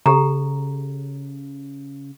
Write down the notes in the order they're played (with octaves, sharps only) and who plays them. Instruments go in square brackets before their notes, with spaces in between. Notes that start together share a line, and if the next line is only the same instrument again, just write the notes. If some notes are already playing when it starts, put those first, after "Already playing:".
[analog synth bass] C#3 [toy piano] G4 A4 A#5